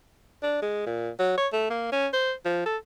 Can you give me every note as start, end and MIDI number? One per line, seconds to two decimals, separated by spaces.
0.43 0.62 62
0.62 0.83 56
0.86 1.10 46
1.19 1.34 54
1.38 1.47 73
1.53 1.66 57
1.70 1.91 58
1.92 2.07 61
2.13 2.33 72
2.45 2.65 53
2.66 2.77 69